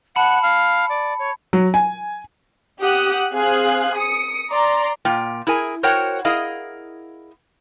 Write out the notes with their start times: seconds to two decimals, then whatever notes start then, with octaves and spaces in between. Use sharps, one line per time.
0.16 F#5 A5 B5 C#7
0.42 F5
0.89 D5
1.19 C#5
1.53 F#3
1.74 G#5
2.80 G4 F#5 D#6 F#6
3.33 C4 G#4 F5 F#6
3.97 D#6 C#7
4.51 D5 A#5 C6
5.05 A#2 A#3 F4 G5
5.47 E4 G#4 A#4 G#5
5.83 F#4 A#4 C5 C#5 F#5 G5
6.25 E4 G#4 A#4 D#5 F5